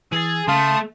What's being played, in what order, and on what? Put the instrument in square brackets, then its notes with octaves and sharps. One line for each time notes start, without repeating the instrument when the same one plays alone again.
[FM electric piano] E3 A6 [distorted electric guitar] G#4 [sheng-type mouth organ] E6
[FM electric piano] C#3 F5 [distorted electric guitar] A3 [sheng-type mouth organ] A5 C6 D#6